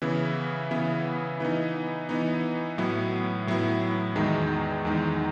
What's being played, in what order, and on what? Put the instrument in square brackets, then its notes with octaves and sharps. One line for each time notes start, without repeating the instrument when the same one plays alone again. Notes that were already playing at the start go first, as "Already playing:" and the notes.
[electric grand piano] C#3 E3 B3 E4
C#3 E3 B3 E4
E3 B3 D#4
E3 B3 D#4
A2 F#3 B3 E4
A2 F#3 B3 E4
E2 D#3 G#3 D#4
E2 D#3 G#3 D#4